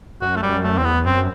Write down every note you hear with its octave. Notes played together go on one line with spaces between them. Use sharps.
F#2 F#4
A3
G3
F#2
A3
E2 C4
B3
F#2 C4